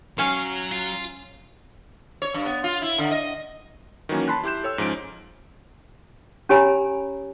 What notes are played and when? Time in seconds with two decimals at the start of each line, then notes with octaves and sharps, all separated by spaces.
0.18 F#3 C#4 F5
0.72 F4
2.22 C#5
2.34 G2
2.46 B3
2.64 F4
2.82 E4
2.98 D3
3.11 D#5
4.09 D#3 E3 F#3 A#3 C#4
4.28 A5 B5 C6 F#6
4.44 E4 G4 C6 G6 E7
4.64 A4 C#5 G5 E6
4.78 G#2 F3 C#4 D7
6.49 C#4 G4 C#5 G#5 A#5 B5